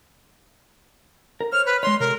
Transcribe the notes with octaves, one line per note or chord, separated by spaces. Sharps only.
A#4
C5 C#5 F6
B4
G#3 C#5 C6
C3 A4 A#4